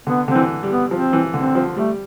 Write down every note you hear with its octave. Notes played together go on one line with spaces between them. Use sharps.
D3 B3
D3 C4
E3
G3
B3
F3 C4
E3
D3 C4
F3
G3 A3